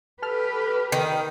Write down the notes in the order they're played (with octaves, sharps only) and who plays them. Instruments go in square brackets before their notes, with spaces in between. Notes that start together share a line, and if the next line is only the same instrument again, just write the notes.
[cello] G4 B4 [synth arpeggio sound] A4 F6
[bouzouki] D#3